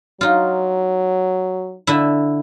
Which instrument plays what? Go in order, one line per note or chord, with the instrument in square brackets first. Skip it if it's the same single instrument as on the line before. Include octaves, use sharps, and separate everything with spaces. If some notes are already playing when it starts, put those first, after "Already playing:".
[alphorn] F#3 [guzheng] D#4 F4
[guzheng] D3 E4